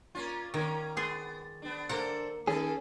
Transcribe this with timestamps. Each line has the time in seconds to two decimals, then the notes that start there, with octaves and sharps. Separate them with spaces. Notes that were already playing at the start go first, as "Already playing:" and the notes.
0.15 A#3 C#4 F4
0.54 D#3 A#3 C#4
0.97 B3 G#4 C6
1.62 B3 D4
1.89 A#3 D4 A4 A#4 C5 F#5
2.47 D#3 C#4 G#4 A4